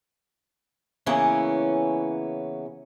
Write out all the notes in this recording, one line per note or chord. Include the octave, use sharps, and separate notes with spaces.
C#3 E3 A#3 B3 C#4